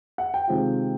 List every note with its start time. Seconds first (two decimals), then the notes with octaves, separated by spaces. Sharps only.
0.18 F#5
0.34 G5
0.48 C3 D#3 G#3 C4 F4